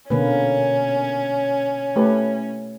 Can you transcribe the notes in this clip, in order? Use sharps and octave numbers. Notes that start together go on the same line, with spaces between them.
B2 D3 A#3 C#4 B4
A3 G4 B4